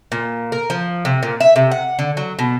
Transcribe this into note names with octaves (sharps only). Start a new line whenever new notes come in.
A#2
A#4
F3
C3
A#2
E5
C3
F#5
D3
F#3
B2